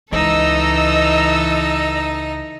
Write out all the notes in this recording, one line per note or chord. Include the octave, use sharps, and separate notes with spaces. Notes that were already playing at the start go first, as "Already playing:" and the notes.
C#2 E3 D#4 A4 D#5 A#5 E6